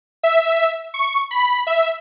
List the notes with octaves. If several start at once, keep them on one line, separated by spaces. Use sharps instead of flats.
E5
C#6
B5
E5